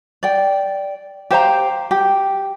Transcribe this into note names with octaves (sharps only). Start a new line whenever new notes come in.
D5 G5
G4 C5 F5 A#5
G4